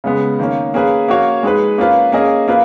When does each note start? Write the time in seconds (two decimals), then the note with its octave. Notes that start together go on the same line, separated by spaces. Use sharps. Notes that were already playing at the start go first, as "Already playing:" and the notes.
0.04 C#3 G#3 B3
0.39 D#3 A#3 C#4
0.74 A#3 C#4 G#4 B4
1.08 A#3 C#4 F#4 C#5 F5
1.43 G#3 D#4 G#4 B4
1.78 A#3 C#4 F4 B4
2.12 A#3 C#4 G#4 D#5
2.48 A#3 F4 B4